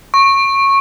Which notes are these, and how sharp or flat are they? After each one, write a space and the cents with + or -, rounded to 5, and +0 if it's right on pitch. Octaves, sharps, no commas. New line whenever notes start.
C#6 -15